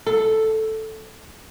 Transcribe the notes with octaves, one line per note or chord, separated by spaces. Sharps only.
A4